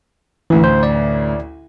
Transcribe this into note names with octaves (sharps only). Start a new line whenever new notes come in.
A1 D2 E3
C5
D5